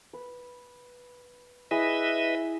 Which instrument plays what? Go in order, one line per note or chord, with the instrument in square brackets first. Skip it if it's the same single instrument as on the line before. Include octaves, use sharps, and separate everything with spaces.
[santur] B4
[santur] E4 G#4 [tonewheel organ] B4 D#5 E5